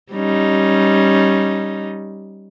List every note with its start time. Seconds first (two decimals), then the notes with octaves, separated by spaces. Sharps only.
0.13 G3 C#4 D#4